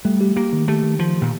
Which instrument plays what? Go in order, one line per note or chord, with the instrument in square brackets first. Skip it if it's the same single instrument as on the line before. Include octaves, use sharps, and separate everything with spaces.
[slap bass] G3 [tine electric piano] A3
[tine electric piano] G4
[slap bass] A#3 [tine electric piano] G4
[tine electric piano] D#3
[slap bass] A3 [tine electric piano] G4
[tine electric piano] D#3
[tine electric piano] D#3 [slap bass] F3
[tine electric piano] D#3
[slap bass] A#2